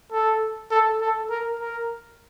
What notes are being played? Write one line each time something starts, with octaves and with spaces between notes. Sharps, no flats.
A4
A4
A4
A#4
A#4